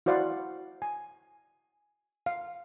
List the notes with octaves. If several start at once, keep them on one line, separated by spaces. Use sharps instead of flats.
E4 F#4 C5 D5 F5 F#5
G#5
F5